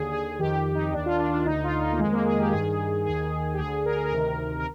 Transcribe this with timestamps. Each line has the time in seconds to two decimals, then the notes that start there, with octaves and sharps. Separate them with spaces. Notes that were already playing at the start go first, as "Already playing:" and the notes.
Already playing: D#2 D3 G#4
0.12 G#4
0.39 F2 D#3 G4
0.75 D#4
0.92 D#2 D#3 D4
1.06 F4
1.19 D4
1.32 D4
1.46 D2 D3 D#4
1.64 F4
1.81 D#4
1.93 A#3
1.99 F2 D#3 G#3
2.12 A#3
2.26 G#4
2.39 G4
2.52 G2 D#3 G#4
3.05 D#2 D#3 G#4
3.54 G4
3.59 D2 D3 G#4
3.86 A#4
3.96 G#4
4.05 A#4
4.12 D2 C3 D#3
4.60 A#4